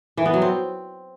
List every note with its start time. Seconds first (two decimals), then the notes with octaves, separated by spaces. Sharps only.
0.17 E3
0.26 B3
0.34 F#3
0.42 C4